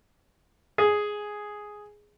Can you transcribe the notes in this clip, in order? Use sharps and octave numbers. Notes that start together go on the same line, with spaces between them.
G#4